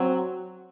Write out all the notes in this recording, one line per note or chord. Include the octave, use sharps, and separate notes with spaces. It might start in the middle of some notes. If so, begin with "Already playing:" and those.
Already playing: F#3 C4